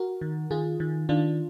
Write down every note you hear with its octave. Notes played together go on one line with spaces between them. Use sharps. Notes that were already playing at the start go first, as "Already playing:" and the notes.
Already playing: F#4 A#4
D#3
D#3 F4 G#4
D#3
D#3 D4 F4